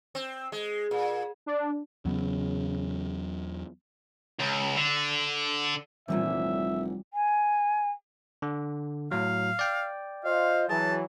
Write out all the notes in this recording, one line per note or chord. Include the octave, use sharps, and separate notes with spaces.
C4
G#3
A#2
D4
E2 C#3 F#3 B3
C#2
D3
F1 A#2 D3 E3 F3 G3 C#4 E5
G#5
D3
A2 F#3 F5
D5 G5
F4 C5 D#5 F5
E3 F#3 G#4 A5